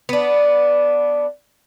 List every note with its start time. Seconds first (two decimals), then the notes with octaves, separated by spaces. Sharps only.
0.09 B3 D4